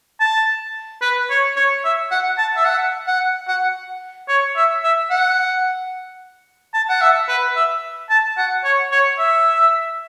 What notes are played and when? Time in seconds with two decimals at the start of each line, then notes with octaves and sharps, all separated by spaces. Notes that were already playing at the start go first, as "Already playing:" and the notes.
0.20 A5
1.02 B4
1.30 C#5
1.56 C#5
1.84 E5
2.11 F#5
2.38 A5
2.56 E5
2.65 F#5
3.07 F#5
3.48 F#5
4.28 C#5
4.56 E5
4.83 E5
5.10 F#5
6.74 A5
6.89 F#5
7.01 E5
7.28 B4
7.56 E5
8.10 A5
8.37 F#5
8.64 C#5
8.91 C#5
9.19 E5